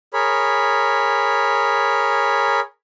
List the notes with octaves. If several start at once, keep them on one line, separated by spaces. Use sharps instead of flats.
G#4 A#4 C#5 B5